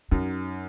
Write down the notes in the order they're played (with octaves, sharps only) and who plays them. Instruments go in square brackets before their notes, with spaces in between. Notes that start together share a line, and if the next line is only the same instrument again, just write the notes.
[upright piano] F#2 [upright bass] D#4